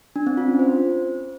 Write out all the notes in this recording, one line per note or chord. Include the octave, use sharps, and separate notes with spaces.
D4
C4
F4
C#4
C5